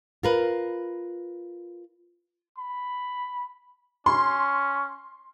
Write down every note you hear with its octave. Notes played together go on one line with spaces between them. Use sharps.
F4 A#4 B4
B5
C#4 C6